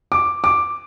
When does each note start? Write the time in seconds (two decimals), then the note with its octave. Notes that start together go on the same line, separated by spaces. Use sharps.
0.12 D6
0.44 D6